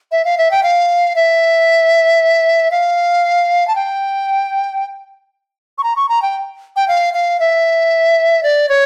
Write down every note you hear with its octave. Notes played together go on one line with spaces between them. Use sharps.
E5
F5
E5
G5
F5
E5
F5
A5
G5
C#6
A#5
C#6
A#5
G5
G5
F5
F5
E5
D5
C#5